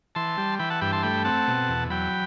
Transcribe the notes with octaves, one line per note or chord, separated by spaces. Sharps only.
E3 A5 C6
G3
E3 G5 B5
F#5 A5
G2 G5 B5
A5 C6
A3 G5 B5
C4 F#5 A5
B2
E2
F#3 G5 B5